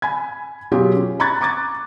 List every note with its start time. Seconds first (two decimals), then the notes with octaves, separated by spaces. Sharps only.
0.02 G#5 B5 G#6
0.71 B2 F#3 C#4 F4 G4 G#4
0.97 C#4
1.20 A#5 B5 C#6 F#6 G#6 A6
1.41 A#5 C#6 D6 G#6 A6